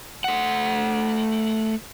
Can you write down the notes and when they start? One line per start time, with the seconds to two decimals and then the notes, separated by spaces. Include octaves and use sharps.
0.24 A3 F#5